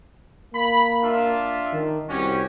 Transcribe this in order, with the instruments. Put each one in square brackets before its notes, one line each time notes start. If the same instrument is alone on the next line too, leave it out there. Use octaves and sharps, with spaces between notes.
[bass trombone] A#3 [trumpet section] B5
[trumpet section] D4 F4 E5
[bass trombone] D#3
[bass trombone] C2 [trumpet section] C#4 F#4 G4